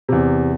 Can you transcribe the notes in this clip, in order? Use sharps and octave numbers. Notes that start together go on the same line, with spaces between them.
E2 C3